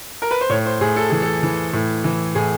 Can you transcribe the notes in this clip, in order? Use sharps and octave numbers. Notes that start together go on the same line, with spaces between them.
A#4
B4
C5
A2 C#5
C5
A2 G#4
A4
E3 G#4
A4
E3
A2
E3
A2 G#4